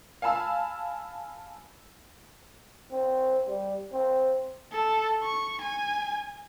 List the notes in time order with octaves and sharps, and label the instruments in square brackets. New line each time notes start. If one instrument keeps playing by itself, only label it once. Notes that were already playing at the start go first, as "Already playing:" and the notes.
[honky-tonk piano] F5 G#5 A5 B5 E6
[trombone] C4
G3
C4
[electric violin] A4
C#6
G#5